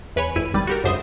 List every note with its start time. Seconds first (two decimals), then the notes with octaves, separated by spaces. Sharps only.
0.16 E2 B4 C#5 G#5 B5
0.35 G#1 F2 E4 D#7
0.54 G#1 G3 B5 A6
0.67 F#4 G4 A#4
0.84 C#2 F#2 D3 C5 E5 D#6